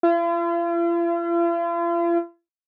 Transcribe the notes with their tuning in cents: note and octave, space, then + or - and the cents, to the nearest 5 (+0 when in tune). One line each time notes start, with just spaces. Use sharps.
F4 -45